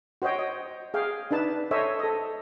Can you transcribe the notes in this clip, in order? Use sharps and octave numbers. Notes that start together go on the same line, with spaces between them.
F#4 C5 C#5 D#5 G5
D#5
G#4 F5 G5
D4 D#4 B4 A5
A4 C5 C#5 D#5 E5 G#5
A4 D#5